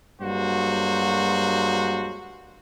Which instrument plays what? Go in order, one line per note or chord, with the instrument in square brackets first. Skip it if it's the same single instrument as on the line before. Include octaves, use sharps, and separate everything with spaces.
[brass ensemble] G2 F#3 G#3 A#3 F#4 C5